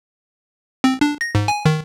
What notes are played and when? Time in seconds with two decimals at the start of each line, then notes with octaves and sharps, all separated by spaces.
0.84 C4
1.01 D4
1.21 A#6
1.35 G#2
1.48 G#5
1.65 D#3